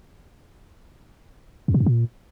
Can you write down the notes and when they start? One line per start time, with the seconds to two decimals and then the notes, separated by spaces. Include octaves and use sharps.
1.68 E2
1.74 A#2
1.80 F2
1.86 A#2